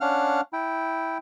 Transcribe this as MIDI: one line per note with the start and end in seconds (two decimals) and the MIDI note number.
0.01 0.41 61
0.01 0.41 62
0.01 0.41 77
0.01 0.41 78
0.01 0.41 89
0.53 1.18 64
0.53 1.18 79